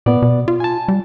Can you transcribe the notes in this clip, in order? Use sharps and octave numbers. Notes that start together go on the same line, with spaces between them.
A#2 B3 D5
B2
F4
G#5 A5
G3